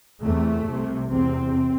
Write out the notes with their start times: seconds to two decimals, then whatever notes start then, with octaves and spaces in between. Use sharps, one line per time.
0.23 E2 C3 A3
0.68 C2 C3
1.11 E2 C3 C4